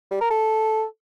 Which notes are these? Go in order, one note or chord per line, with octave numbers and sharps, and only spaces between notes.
G3
A#4
A4